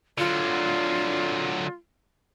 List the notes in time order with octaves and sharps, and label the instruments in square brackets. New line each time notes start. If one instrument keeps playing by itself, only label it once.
[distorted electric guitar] D3 F#3 [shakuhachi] F4